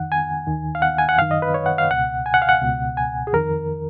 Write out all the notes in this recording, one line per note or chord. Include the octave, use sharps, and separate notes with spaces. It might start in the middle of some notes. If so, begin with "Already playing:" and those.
Already playing: F2 D#3 F#5
G#5
D#2 D#3
F5
F#5
G#5
F#5
F#2 D#3 F5
D#5
B4
C#5
F#5
F5
C#2 B2 F#5
G#5
F#5
F5
F#5
C#2 B2
G#5
G#4
F2 D#3 A#4